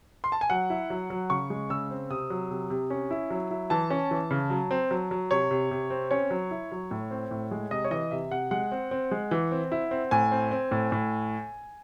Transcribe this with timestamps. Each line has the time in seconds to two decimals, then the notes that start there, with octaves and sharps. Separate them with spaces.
0.24 C6
0.32 A5
0.41 G#5
0.50 F#3 F#5
0.70 E4
0.90 F#3
1.10 F#3
1.30 C#3 C#6
1.50 G#3
1.70 C#3 E6
1.90 C4
2.10 C3 D#6
2.30 F#3
2.51 C3
2.70 C3
2.90 C#4
3.11 E4
3.30 F#3
3.51 E4
3.70 E3 A5
3.90 C#4
4.11 E3
4.31 C#3
4.50 F#3
4.71 C4
4.91 F#3
5.11 F#3
5.31 C3 C#5
5.51 C3
5.71 C3
5.90 C4
6.11 C#4 C#5
6.31 F#3
6.51 E4
6.72 F#3
6.91 A2
7.11 C4
7.31 A2
7.51 G#3
7.71 C3 D#5
7.84 C#5
7.91 E3 D#5
8.11 C3 E5
8.31 C3 F#5
8.51 G#3 F#5
8.72 C4
8.91 C4
9.11 G#3
9.31 E3
9.51 C4
9.72 E4
9.91 C4
10.11 A2 G#5
10.31 C4
10.51 C4
10.71 A2
10.92 A2